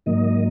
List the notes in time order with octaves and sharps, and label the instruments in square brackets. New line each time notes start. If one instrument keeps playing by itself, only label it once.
[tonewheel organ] G#2 D#3 F#3 A#3 D#5